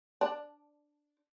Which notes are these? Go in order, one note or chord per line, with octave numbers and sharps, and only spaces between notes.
D4